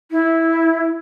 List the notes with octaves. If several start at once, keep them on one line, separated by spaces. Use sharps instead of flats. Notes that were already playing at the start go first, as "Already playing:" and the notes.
E4